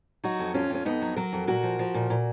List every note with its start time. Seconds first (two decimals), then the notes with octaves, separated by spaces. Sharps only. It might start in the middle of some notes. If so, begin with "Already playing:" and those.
0.24 F#3 D#4 F#4
0.39 F2
0.54 F2 C#4 F4
0.70 F2 C#4
0.85 F2 B3 D#4
1.02 F#3
1.16 F#3 F#4 A#4
1.33 F2
1.47 A#2 F#4 A#4
1.63 F3
1.79 F3
1.94 A#2
2.10 A#2